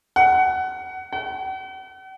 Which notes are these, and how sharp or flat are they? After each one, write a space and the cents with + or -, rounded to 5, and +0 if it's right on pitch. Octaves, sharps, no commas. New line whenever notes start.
F#5 +20
F#5 +45